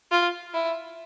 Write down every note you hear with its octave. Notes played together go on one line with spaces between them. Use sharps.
F4
E4